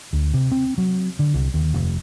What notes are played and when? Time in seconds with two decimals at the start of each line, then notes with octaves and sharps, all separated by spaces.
0.13 D2
0.34 C3
0.51 C4
0.78 F#3
1.19 D3
1.34 C2
1.54 D#2
1.74 F1